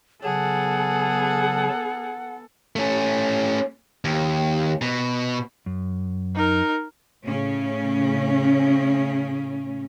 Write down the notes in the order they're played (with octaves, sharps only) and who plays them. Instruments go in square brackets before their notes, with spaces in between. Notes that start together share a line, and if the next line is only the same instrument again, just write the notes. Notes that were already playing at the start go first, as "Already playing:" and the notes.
[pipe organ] C#3 F#3 A5 [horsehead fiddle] B3 A4 [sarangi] G#4 [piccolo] F#5
[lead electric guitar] A3 C#4
D#2
B2
[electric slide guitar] F#2
[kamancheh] D#4 A#4
[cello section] A2 C#3 C#4